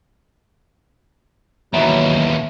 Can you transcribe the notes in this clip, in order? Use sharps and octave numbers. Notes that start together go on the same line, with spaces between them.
D#2 B2 D#3 E3 F#3 E5 A#5